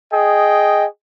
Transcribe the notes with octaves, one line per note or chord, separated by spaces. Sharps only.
G#4 D#5 G5